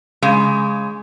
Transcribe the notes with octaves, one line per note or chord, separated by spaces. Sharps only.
C#3 G#3